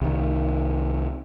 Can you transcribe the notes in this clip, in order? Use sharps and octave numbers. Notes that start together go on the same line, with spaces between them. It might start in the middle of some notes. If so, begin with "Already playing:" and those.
C2 D#3